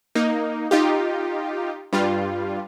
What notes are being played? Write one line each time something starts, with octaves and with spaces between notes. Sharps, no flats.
A#3 D#4
D#4 F4 G4
G2 G3 F4